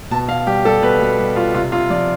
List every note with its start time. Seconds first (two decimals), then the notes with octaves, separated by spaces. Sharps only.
0.11 B2 A5
0.28 B2 F5
0.46 G3 G4
0.65 G3 A4
0.82 B2 B4
1.01 B2
1.18 G3
1.36 G3 F4
1.54 C3 F4
1.72 C3 F4
1.90 F3 D5